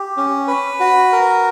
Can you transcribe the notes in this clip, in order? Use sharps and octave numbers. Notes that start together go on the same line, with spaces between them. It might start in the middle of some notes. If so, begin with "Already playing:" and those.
Already playing: G4
C#4
B4
F#4
A#4